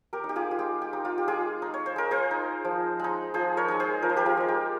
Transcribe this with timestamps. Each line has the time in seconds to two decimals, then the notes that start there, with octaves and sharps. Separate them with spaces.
0.13 G4 A#4
0.24 D#4
0.29 G4
0.36 F4 G#4
0.51 F4
0.59 G#3 G4
0.82 G4
0.93 D#4
1.05 F4
1.18 G4
1.28 G#3 F4 G#4
1.62 D#4
1.74 C#5
1.86 C5
1.96 G#3 A#4
2.11 G#4 C5
2.31 D#4
2.65 F3
3.00 G#3 D#4
3.34 F3 G#4 C5
3.57 A#4 C#5
3.68 G#3 D#4
3.80 G#4 C5
4.02 F3 A#4
4.10 C5
4.16 G4 A#4
4.26 F4 G#4
4.37 G#3 D#4
4.48 G4